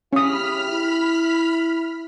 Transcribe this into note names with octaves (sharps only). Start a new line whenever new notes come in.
C#3 C#4 E4 G4 B5 D#6 F6 B6
E4